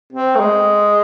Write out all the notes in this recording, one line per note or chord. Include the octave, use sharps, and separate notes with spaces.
C4
A3
G#3